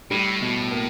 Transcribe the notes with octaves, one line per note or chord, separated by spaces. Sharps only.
A2 G3
B2
A#3